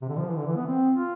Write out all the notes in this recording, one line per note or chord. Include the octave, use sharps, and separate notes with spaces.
C3
D3
F3
E3
D3
E3
B3
C4
F4